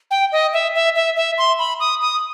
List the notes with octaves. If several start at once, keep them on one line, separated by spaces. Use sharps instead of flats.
G5
D#5
E5
E5
E5
E5
C6
B5
D#6
D#6